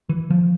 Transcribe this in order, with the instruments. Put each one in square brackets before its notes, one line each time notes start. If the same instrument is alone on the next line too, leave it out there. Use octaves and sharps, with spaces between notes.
[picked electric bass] E3
F3